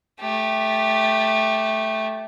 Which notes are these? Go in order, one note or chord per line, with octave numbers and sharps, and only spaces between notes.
A3 G4